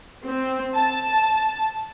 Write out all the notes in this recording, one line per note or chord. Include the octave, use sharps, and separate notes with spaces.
C4
A5